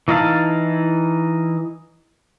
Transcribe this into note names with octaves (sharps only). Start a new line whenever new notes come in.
E3 D#4 E4 F5 A5